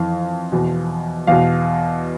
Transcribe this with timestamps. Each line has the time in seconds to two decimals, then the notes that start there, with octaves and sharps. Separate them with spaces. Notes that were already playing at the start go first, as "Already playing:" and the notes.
Already playing: F2 E3 F5
0.52 E2 B2
1.27 E2 B2 F5